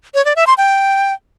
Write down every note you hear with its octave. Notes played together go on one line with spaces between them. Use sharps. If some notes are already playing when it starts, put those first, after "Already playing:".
C#5
D5
E5
C6
G5